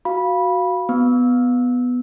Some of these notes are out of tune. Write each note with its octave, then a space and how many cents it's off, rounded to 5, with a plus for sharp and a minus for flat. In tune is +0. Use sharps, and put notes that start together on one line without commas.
F#4 +0 F5 +0 B5 -15
B3 +5 E6 -20